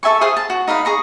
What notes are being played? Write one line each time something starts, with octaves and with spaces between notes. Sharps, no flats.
A4 E5 G#5 C#6
G#4 C5 F5 G#5
A5
F#4
D#4 A#4 B4 F5
G#4 A#5 C#6